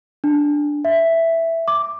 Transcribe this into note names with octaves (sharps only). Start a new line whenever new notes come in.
D4
E5
D6